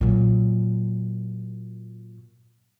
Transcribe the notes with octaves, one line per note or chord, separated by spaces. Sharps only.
A#2 F#3